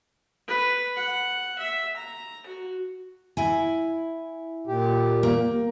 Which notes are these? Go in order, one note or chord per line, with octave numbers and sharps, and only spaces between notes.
B4
F#5
E5
A#5
F#4
E4 G#5
A#2 G4
A#3